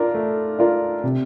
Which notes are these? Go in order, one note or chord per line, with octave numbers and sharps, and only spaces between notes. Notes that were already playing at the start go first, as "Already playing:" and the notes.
Already playing: D4 F4 A#4
A3
D4 F4 A#4
C3